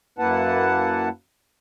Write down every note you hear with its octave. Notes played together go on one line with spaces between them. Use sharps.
F#2 A#3 E4 B4 F#5 A5